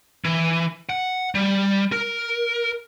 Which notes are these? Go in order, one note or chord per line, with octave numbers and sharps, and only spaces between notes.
E3
F#5
G3
A#4